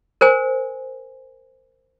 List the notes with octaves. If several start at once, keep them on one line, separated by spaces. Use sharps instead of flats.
A#4 C5 G#5